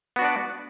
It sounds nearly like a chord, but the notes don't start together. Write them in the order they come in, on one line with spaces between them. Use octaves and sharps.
B3 F#4 D4 D5